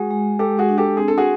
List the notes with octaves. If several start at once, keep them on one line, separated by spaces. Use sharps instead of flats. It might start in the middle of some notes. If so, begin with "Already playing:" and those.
Already playing: G#3 F#4 G#4
G#3
G#3 G4 A4
F#4 G#4
D4
G4 A4
C4 G#4
A4
F#4 G#4